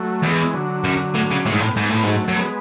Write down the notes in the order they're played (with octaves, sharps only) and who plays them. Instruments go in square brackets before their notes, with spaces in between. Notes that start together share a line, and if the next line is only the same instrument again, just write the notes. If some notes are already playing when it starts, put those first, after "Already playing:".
Already playing: [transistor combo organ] F#3 A3
[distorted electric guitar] E2 [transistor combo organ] E3 G#3
[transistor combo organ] D3 F#3
[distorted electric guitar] F#2
A2
C#3
[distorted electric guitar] A2 [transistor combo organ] E3 G#3
[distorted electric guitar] G#2
[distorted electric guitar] A2 [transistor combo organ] A3
[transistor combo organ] B3
[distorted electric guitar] G#2 [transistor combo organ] A3
[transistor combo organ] B3
[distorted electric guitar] A2 [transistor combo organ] A3
[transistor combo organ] B3
[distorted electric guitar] G#2 [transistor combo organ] F#3 A3
[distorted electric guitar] F#2
[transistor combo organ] G#3 B3